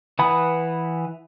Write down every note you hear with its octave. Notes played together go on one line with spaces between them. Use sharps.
E3 B4 F#5 B5 D#6